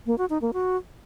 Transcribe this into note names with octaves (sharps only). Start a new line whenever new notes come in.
A#3
F#4
D#4
A#3
F#4